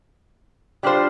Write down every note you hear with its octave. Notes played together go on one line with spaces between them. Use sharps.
G3 D4 F4 C5